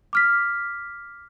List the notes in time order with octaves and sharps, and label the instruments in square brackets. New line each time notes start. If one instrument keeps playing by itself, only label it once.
[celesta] D6 F6 B6